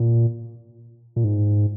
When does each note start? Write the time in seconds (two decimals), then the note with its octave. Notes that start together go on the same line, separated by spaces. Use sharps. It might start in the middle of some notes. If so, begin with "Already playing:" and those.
Already playing: A#2
1.16 A#2
1.24 G#2